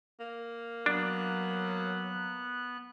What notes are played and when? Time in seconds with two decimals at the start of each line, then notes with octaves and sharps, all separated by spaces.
0.20 A#3
0.86 F#3 B3 D4 F#6